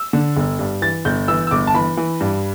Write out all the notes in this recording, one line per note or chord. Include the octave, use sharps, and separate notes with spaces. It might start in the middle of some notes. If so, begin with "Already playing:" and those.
Already playing: E6
D3
G1
G2
E3 A6
G1 G6
E3 E6
E6
G1 D6
A5
E3 B5
E3
G2